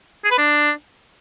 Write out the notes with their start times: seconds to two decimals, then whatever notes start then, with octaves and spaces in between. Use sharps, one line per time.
0.24 G#4
0.31 B4
0.38 D4